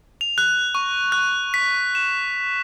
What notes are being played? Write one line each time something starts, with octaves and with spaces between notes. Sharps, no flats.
F7
F#6
C#6
F#6
B6
E7